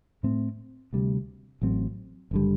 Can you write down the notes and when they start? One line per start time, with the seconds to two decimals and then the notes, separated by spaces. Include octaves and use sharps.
0.23 A2 A3 C4
0.93 D2 C3 G3
1.62 A1 A2 F#3 C4
2.31 F#1 D3 G3